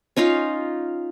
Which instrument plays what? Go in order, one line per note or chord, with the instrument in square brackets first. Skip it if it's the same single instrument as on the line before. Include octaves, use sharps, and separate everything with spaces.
[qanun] C#4 D#4 F4 F5